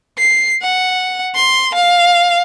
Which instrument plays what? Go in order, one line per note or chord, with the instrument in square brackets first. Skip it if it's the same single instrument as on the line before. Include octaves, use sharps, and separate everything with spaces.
[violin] C7
F#5
C6
F5